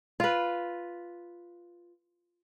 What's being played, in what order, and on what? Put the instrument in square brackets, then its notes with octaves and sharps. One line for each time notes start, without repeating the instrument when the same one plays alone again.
[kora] F4 B4